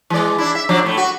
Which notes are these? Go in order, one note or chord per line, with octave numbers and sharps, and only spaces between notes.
E3 G#3 D5
D4 E4
E5
F3 F#3 D4
A2 A3
F#4